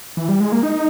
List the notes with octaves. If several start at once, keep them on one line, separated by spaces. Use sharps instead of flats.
E3
G3
G#3
A#3
D#4